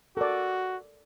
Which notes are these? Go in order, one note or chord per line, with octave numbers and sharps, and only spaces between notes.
F#4 A4 A#4 D5